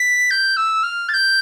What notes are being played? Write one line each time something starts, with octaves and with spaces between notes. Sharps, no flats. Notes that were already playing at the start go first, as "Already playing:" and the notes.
Already playing: B6
G6
E6
F6
A6
G6